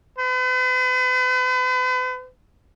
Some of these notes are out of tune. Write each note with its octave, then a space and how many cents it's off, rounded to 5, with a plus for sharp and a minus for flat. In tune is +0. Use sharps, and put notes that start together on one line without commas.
B4 +45